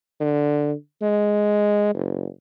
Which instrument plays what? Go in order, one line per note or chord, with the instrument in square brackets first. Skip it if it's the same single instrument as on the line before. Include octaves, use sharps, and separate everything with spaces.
[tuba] D3
G#3
F#1